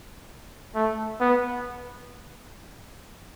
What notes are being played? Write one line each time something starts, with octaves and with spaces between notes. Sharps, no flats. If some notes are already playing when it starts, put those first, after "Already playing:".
A3
B3